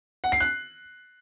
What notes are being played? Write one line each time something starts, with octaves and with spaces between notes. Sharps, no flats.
F#5
C7
F#6